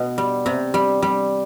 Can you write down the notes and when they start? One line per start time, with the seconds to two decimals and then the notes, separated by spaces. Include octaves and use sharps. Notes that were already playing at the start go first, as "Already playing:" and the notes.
Already playing: B2
0.18 G3
0.46 C3
0.74 G3
1.02 G3